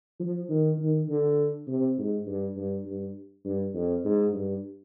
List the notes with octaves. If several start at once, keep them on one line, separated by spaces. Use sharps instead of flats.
F3
D#3
D#3
D3
C3
G#2
G2
G2
G2
G2
F2
G#2
G2